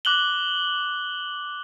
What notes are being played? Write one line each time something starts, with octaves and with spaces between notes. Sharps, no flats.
D6 F#6 F#7 G7